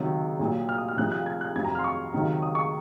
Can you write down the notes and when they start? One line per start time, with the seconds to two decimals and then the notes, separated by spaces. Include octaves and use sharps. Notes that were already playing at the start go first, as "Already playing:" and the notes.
Already playing: C#2 C3 D#3 F#3
0.39 C2 A#2 F#3
0.69 F6
0.78 D#6
0.88 F6
0.97 C2 C3 F3 F#6
1.12 F#6
1.26 G#6
1.41 F#6
1.55 F2 C3 F#3 G#6
1.65 A#5
1.75 F6
1.79 C6
1.84 C#6
2.14 C#2 C3 D#3 F#3
2.42 D#6
2.55 C#6